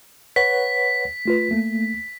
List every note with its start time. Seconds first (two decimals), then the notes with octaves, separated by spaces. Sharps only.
0.36 B4 C#5 F#5 B6
1.25 A3 F4 B4
1.51 A3 A#3